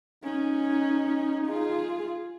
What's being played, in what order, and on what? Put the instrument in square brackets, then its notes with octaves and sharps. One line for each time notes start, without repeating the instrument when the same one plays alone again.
[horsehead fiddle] C#4 [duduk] D#4
[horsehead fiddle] F4 G#4